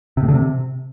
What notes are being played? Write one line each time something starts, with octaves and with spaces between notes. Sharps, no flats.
C3
A2
D3
C3